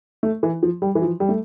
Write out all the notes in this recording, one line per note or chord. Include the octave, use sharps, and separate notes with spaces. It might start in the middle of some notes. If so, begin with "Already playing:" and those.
A3
E3
F3
G3
E3
F3
G3
A3